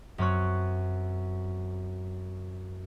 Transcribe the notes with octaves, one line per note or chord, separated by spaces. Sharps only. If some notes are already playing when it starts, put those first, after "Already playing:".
F#2 C4 C#5 F#6